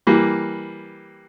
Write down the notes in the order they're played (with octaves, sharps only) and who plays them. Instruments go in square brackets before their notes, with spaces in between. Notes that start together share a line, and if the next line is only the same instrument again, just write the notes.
[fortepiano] E3 G3 A#3